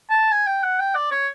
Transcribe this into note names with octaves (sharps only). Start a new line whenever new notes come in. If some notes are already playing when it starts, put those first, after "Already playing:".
A5
G#5
G5
F#5
G5
D5
C#5